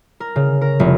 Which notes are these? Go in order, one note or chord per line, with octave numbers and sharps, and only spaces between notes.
A#4
C#3
A#4
F1